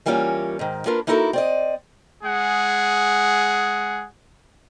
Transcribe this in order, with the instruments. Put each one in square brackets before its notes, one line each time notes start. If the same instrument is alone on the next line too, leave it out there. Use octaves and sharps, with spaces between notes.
[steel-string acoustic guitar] E3 G3 A#3 C#4 F4 C#5
G#2 D#3
A#3 D4 F4 A#4 B4
A#3 D#4 E4 F#4 A4 A#4
C4 D5 D#5
[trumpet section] G#3 G#4 F#5